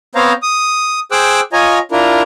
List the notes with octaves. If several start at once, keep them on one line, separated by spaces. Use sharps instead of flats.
B3 C4 C5 C#5 F5 A#5
D#6
G#4 C5 G5 D6 E6 F#6
F4 C#5 D#5 G#5 A#5
D4 E4 F4 A#4